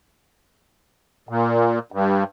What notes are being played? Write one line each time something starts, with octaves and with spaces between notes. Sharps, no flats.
A#2
G2